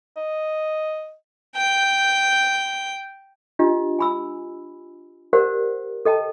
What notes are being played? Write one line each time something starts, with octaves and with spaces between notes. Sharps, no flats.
D#5
G5 G6
D4 F4 G4 D#5
G#5 B5 E6
G4 A#4 C5 D5 F#5
A4 D#5 G5 A5